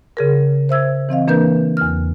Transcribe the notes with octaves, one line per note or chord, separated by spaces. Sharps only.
C#3 G#4 A#4
C5 E5 E6 G#6
E3 C4 D#5 F5
E3 A#3 D4 A#4 B4 G6
E2 F6